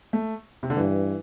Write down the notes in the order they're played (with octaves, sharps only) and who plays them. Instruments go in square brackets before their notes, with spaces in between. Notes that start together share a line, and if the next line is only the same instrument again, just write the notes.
[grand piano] A3
C3
D3
[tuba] G2 [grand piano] E3